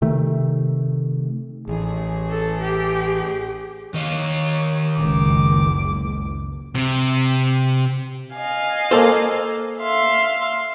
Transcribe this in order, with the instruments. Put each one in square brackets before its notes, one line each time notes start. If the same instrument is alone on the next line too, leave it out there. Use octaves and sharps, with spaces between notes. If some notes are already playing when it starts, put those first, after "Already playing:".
[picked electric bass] C3 D#3 A3
[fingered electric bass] A1 [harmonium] G#4
[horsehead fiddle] A4
G4
[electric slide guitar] D#3 D#5 F5 [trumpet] C#5
[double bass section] F#1 C#2 [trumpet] D6
[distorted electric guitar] C3
[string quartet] D#5 F5 G#5
[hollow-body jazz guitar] A#3 A4 C5
[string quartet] E5 F5 C6